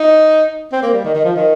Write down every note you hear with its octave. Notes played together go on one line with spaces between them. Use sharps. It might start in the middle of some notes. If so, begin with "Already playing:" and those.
Already playing: D#4
C4
A#3
G3
D#3
D#3
F3
D#3